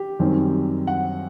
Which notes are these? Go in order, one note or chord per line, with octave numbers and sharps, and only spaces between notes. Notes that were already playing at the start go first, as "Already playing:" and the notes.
Already playing: G4
F#2 D#3 G3 C4
F#5